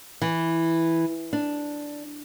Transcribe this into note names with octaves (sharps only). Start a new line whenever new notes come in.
E3
D4